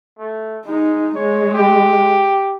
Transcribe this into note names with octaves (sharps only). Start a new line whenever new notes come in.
A3
G#3 D#4
G#3 C#5
G4